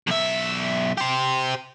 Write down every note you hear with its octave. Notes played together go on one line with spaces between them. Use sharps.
B1 E5
G4 C5